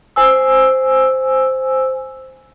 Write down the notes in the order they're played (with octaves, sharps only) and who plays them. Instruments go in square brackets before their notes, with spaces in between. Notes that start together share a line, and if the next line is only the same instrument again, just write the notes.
[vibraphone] C5 G#5 E6